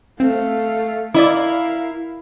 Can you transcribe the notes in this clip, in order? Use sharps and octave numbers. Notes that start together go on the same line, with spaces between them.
A3 C4 F5
E4 A#4 D5 D#5 F5 D6